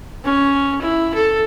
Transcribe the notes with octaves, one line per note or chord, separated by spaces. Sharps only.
C#4
E4
A4